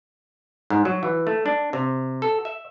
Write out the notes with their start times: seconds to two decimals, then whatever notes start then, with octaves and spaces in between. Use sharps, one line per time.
0.70 G#2
0.85 F#3
1.03 E3
1.27 A3
1.46 D4
1.73 C3
2.22 A4
2.45 E5